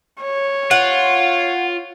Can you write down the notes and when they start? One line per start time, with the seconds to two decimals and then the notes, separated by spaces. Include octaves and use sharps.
0.22 C#5
0.71 F4 F#5